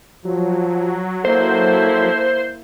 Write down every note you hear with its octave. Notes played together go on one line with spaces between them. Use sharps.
F3 F#3
A#3 E4 A4 C5